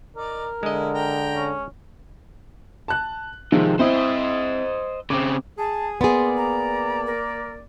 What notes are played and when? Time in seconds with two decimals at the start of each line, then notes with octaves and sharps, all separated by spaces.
0.16 D#4 A#4 D5
0.63 D3 G#3 E4 D#5
0.94 G5 A#5
1.32 C#4
2.88 A5 F#6
3.52 C3 D#3 F3 G#3
3.79 C4 E4 C5 D#5
5.10 C#3 C4 D6
5.58 G#4 A5
6.01 A#3 B3 G#4 D5 C6
6.37 A#5
7.06 A#4